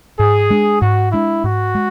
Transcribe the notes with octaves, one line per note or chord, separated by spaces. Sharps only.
G#2 G#4
G#3 D4
G#2 F#4
G#3 D4 E4
G#2 F#4
G#3